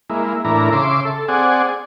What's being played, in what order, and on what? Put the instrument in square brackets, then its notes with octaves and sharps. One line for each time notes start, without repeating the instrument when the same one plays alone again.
[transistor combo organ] G#3 A#3 E4
A2 E3 D4 E4 A#4 A#5
C#3 E5 C6 D6
A4
C4 G#4 D5 F#5 G#5